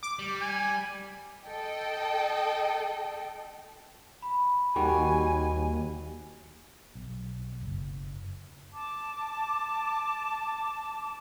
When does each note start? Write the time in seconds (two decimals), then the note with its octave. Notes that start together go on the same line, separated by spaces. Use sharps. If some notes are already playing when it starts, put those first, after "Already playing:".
0.03 D6
0.19 G3
0.41 G#5
1.46 A4 D#5 G5
4.22 B5
4.76 D#2 D#3 G3 F#4 G#5
6.95 B1
7.61 F#1
8.73 A5 D6